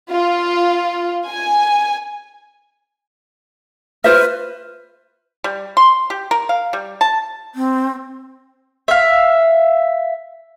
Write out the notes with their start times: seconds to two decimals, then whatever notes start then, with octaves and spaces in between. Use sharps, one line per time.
0.11 F4
1.28 G#5
4.04 F4 B4 C5 E5 F6
5.44 G3
5.77 C6
6.10 G4
6.31 A#4
6.49 F5
6.73 G3
7.01 A5
7.55 C4
8.88 E5 F5